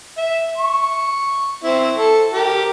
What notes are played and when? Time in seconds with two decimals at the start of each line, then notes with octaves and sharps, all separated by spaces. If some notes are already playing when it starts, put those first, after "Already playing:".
0.18 E5
0.58 C#6
1.64 C4 E4
1.97 A4
2.34 G4 A#4